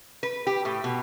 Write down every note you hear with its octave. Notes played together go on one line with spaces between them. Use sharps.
B4
G4
A2
B2